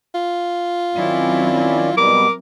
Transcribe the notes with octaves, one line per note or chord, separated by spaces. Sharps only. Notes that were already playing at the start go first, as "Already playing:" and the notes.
F4
D#3 F#3 C4 C#4 E4 D5
B2 G3 B3 A#4 D6